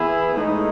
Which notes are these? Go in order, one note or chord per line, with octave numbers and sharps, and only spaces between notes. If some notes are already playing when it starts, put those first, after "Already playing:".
Already playing: E3 B3 E4 G#4
A2 G#3 D#4